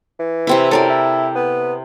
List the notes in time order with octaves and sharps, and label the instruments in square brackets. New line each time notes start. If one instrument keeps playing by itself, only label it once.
[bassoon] E3
[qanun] C3 C4 E4
[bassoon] F#2 [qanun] A4 A#4 D5
[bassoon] E4
B3